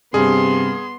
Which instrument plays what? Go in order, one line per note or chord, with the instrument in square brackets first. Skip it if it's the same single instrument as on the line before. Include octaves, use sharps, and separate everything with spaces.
[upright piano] G2 [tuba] C3 [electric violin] B3 C6 [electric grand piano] G#4